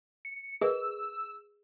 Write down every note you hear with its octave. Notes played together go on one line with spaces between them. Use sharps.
C#7
G#4 A#4 B4 D#5 E6